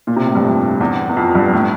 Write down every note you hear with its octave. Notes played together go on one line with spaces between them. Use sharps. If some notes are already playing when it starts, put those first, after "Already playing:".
A#2
C3
A2
G2
F2
E2
E2
F2
G2
A2